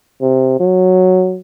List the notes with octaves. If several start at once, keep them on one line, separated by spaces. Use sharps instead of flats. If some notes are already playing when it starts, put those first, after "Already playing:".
C3
F#3